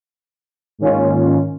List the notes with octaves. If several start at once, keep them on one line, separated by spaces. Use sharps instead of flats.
G#2 D#3 A#3 C#4 F4